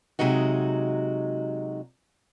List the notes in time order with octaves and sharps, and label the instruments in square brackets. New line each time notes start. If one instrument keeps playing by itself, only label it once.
[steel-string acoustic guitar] C3 F#3 G#3 D#4 F#4